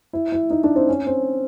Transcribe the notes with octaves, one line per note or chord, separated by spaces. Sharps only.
E4
E4
D#4
D4
C4
C#4
C4